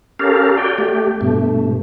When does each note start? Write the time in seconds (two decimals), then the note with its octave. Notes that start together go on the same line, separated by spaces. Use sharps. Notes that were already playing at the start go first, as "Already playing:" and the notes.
0.19 C#4 G4 A4 A#4 F5
0.57 F#4 D5 G5
0.78 A3 G4
1.21 G2 B2 A3